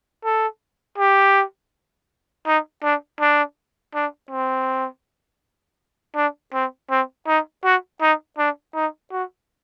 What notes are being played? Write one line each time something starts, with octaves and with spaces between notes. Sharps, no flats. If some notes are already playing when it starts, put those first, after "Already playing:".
A4
G4
D#4
D4
D4
D4
C4
D4
C4
C4
D#4
F#4
D#4
D4
D#4
F#4